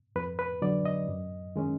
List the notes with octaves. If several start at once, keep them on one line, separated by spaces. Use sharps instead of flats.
F2 B4
B4
D3 F#3 D5
D#5
F#2
D#3 G#3 C#4